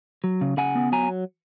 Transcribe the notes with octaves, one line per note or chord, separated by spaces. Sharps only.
F#3
C#3
C#3 F#5 G#5
B3
F#3 G#5 A#5